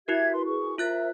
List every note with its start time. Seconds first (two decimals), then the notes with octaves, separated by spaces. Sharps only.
0.08 E4 F#4 G4 A#4 E5 G#6
0.32 B4 C6
0.45 G#4 B4 C#6
0.78 F4 A#4 C5 E5 F#6 A6